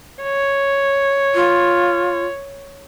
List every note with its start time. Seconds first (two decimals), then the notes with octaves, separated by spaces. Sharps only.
0.23 C#5
1.35 F4